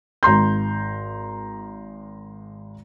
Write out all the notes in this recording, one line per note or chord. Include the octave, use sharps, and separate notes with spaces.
G#1 A#5 C6 G6